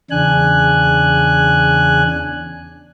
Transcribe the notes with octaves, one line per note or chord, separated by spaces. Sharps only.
E2 C#3 D4 G#5 F#6